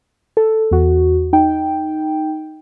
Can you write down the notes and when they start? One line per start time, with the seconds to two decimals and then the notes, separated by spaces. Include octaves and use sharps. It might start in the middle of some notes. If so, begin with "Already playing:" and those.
0.37 A4
0.71 E2 F#4
1.33 D#4 G5